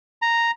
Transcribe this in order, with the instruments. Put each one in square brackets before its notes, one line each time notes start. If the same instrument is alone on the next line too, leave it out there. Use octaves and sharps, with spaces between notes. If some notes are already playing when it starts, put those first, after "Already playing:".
[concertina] A#5